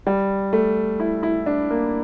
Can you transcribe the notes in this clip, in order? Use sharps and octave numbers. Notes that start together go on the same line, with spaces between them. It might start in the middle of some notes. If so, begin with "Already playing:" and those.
G3
A3
E4
E4
D4
A#3